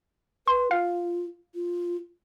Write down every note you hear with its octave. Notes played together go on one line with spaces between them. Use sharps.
B4 C6
F4 F5
F4